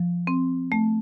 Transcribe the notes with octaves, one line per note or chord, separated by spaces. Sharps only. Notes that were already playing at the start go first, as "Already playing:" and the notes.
Already playing: F3
C4
A3